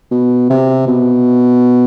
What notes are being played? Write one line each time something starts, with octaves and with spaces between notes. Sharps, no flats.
B2
C3
B2